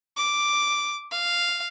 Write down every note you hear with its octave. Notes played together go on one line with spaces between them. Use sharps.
D6
F5